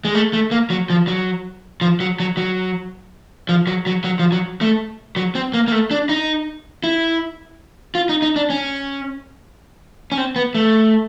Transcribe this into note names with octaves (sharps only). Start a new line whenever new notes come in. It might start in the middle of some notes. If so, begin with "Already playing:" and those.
G#3
A3
A3
A#3
F#3
F3
F#3
F3
F#3
F#3
F#3
F3
F#3
F#3
F#3
F3
F#3
A3
F#3
C4
A#3
A#3
A3
D4
D#4
E4
F4
D#4
D#4
D4
C#4
C#4
C4
B3
A3